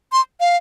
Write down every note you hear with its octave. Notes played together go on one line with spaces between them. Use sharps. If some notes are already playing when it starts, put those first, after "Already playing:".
C6
F5